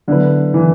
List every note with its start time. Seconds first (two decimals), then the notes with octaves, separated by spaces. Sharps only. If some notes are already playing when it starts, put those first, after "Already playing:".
0.08 D3 F#3 B3 E4 B4
0.54 E3